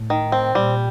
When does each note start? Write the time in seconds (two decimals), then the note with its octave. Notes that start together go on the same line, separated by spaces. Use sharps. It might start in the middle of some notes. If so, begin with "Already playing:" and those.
Already playing: A2
0.10 D#3
0.32 C4
0.55 A#2 G3